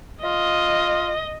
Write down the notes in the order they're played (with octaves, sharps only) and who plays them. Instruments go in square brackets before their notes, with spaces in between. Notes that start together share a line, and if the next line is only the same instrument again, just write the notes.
[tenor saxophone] F4 [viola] D#5